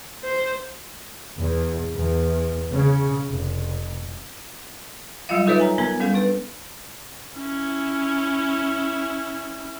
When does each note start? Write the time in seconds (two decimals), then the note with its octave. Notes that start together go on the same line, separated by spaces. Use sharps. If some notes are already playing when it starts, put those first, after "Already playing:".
0.23 C5
1.37 E2
1.93 E2
2.70 C#3
3.30 F1
5.29 F#3 G3 F4 D#5 F5
5.46 D#4 F4 A4 B4 C#5 E5
5.60 G#5 A#5
5.78 B3 A#4 G#5 B5
6.00 G3 C#4 A4 F5
6.14 D4 B4
7.36 C#4 E4